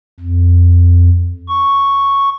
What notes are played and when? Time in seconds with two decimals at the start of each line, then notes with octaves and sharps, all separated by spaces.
0.20 F2
1.49 C#6